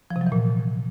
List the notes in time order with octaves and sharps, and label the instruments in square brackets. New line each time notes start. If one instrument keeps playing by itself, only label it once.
[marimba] F3
C3
F#3
E3
A#2